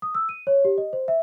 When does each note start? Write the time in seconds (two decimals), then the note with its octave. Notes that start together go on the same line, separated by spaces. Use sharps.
0.02 D#6
0.15 E6
0.29 D#7
0.47 C#5
0.65 G4
0.78 D#5
0.93 C5
1.08 E5